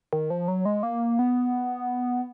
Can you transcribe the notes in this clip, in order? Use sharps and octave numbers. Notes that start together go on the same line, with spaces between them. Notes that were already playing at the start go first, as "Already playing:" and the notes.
D#3
F3
F#3
G#3
A#3
B3